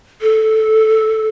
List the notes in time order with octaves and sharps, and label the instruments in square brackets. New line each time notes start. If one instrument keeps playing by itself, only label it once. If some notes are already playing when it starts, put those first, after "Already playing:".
[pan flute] A4